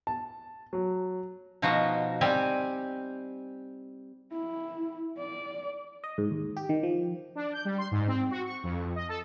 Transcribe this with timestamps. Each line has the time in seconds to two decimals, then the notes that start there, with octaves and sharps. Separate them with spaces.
0.07 A5
0.73 F#3
1.62 B2 F3 D#4 F#4
2.21 G3 C4 G4 G#5
4.32 E4
5.18 D5
6.04 D#5
6.18 G#2
6.31 D#2
6.57 G4
6.69 D#3
6.83 F3
7.35 D4
7.53 G6
7.65 G3
7.78 C6
7.91 G#2
8.08 C4
8.31 F#4
8.44 C#6
8.63 F2
8.95 D#5
9.09 A4